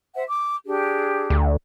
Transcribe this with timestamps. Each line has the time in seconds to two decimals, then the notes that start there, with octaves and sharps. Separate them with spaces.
0.15 C5 E5 F#5
0.27 D6
0.66 D4 G4 G#4
1.30 D2